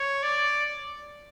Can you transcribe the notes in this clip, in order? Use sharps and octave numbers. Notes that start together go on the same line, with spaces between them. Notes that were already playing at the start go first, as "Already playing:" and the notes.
Already playing: C#5
D5